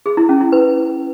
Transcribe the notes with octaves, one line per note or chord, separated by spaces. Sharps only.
G#4
E4
C#4
E4
B4